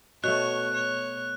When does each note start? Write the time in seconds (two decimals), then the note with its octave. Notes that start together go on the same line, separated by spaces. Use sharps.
0.24 B2 A3 C#5 F#6
0.74 C#5